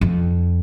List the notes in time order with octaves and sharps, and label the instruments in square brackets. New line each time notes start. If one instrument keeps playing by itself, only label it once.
[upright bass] F2